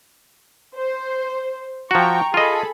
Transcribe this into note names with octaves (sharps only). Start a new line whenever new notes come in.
C5
F3 F#4 G5 A#5 C#6
F4 G#4 A4 D#5 B5